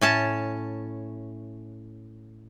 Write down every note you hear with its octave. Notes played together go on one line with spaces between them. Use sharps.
A2 C#4 A5